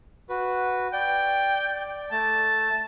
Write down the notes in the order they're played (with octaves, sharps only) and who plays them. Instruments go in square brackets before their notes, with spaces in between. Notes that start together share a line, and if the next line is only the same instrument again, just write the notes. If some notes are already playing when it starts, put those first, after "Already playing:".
[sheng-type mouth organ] F#4 B4
[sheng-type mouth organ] D5 [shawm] G5
[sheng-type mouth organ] A3 [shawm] A5